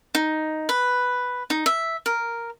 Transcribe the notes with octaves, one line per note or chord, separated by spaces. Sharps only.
D#4
B4
D#4
E5
A#4